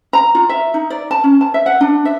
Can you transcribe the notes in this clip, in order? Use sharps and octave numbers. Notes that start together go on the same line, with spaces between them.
A#5
F4
E5
D#4
D5
A5
C#4
A5
E5
F#5
D4
E5